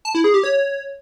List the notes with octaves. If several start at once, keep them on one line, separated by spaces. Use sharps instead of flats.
A5
E4
G#4
G4
C#5